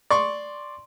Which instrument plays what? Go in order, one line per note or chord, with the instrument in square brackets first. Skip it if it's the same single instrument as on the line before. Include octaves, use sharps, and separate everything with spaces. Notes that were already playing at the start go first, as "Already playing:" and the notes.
[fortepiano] D5 C6 C#6